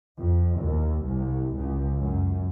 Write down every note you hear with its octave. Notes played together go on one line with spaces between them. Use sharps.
F2
D#2
C2
C#2
F#2